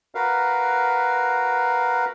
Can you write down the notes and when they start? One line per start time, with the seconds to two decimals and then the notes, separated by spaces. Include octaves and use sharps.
0.15 F#4 A#4 B4 F5